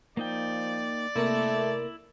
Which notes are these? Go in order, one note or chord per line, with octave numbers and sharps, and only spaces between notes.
F3 A#3 D#4 D5 G5
C3 A3 A#3 E4 A#4